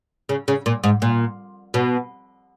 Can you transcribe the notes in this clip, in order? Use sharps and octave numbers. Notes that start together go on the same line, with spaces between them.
C#3
C#3
A#2
G#2
A#2
B2